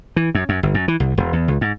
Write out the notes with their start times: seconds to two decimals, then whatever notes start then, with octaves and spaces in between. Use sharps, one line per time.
0.16 E3
0.35 F#2
0.49 F#2
0.63 G1
0.74 F#2
0.88 E3
1.00 C2
1.18 E1
1.33 E2
1.48 C#2
1.61 G#2